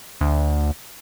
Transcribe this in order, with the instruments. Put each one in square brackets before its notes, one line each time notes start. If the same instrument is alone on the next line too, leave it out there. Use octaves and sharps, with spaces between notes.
[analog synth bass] D2